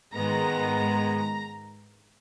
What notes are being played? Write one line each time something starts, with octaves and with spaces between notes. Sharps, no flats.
G#2 D#3 G#3 B3 A#5